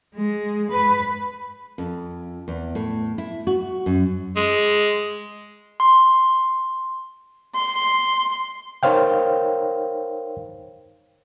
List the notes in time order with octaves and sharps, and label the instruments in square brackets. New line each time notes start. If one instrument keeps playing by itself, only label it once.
[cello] G#3
B4
[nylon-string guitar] F2
E2
A2
E4
F#4
F#2
[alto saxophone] G#3
[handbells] C6
[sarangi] C6
[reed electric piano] D#4 A#4 C5 C#5 F5 G5